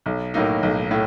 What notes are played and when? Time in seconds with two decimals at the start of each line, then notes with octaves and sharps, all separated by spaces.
0.06 B1
0.34 A2 F#3 A#3 D#4
0.63 B1
0.91 A2